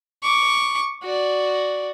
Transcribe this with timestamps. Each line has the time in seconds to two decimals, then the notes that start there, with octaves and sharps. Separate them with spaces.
0.23 C#6 D6
1.03 F#4 D5